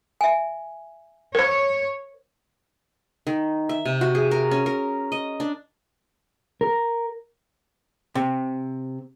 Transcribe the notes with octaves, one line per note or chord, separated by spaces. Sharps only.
E5 G#5
A#4 C5 C#5
D#3
E5
C3
F#4
G#4
A#4
C#4
A#4
D#5
D4
A#4
C3